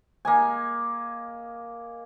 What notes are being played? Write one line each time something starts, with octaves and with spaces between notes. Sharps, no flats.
A#3 D#5 G#5